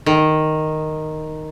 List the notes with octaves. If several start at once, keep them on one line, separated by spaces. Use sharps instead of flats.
D#3